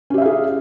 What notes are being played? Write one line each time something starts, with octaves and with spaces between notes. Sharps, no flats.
C#4 G4 G#4 E5 F5